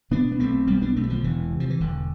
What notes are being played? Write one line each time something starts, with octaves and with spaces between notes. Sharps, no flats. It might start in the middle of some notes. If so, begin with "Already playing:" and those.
B2 B3 D4
B3
B1 A3 C4
B1 G3 B3
B3 D4
B2 A3 C4
G3
D3 F3
E1 E3
C3
F3
E3
E1 D3